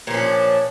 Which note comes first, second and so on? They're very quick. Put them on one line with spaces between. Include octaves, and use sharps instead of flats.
A#2 F3 C#4 D4